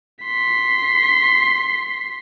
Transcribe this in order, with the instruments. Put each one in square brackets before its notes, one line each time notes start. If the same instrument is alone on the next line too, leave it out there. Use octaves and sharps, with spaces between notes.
[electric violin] C6 B6